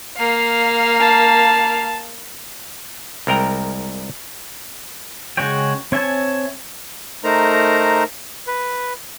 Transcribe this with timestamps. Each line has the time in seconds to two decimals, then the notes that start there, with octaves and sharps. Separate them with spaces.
0.17 A#3 F5
1.00 A5
3.27 C2 G#3 A#4 G5 A#5
5.37 C#3 G#3 F#4 C#5 G5
5.92 C4 C#5 E5 G#5 A5
7.24 A3 D#4 A#4 C5 A#5
8.47 B4